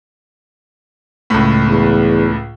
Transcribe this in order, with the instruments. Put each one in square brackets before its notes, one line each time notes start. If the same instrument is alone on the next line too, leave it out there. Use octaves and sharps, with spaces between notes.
[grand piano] C#2 A2
[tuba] E2